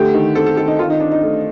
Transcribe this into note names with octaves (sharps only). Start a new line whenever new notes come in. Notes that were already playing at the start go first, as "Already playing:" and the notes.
Already playing: D3 A3 G4
D#3
C4 A4
A4
D#3 A4
D#4
D#3 F4
D#4
C4 D4
D#4
A3